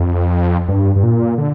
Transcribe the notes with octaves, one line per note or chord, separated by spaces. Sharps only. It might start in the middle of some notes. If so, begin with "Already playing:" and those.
Already playing: F2
G2
G2
A#2
D3